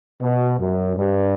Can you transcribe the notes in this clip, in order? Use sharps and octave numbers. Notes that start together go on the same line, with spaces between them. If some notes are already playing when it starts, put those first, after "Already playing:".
B2
F#2
G2